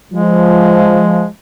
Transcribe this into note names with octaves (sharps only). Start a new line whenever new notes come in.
F3 G#3